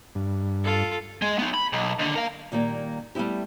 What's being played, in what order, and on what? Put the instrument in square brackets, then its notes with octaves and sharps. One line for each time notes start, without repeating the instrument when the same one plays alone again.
[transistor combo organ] G2
[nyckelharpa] F4 A4
[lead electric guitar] G#3
B3 D#4
B5
B1
D#2 D3
A#4 F5
[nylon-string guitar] A#2 D#3 G3 A#3
G3 A3 B3 E4 G4